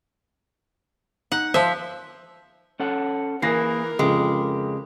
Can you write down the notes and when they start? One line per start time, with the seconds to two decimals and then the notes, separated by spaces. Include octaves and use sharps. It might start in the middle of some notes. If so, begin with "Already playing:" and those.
1.32 D#4 F#5
1.54 F3 C5 E5
2.80 C#4 A4 F#5
3.42 E3 A#3 G#4 A#4 A#6 C7
3.99 F2 C#3 G#3 G4